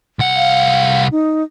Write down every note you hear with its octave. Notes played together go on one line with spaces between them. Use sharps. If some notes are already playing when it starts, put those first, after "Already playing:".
C2 F#5
F5
D#4